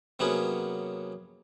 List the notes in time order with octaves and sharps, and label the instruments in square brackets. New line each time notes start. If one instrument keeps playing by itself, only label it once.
[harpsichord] C3 F#3 A#3 B3 C#4 G#4